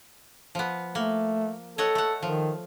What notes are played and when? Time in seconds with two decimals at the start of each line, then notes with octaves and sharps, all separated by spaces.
0.55 F3 B3
0.95 A3 A#3
1.78 A4 C#5 D#5 F#5
1.95 A3 F#5
2.23 D#3 F3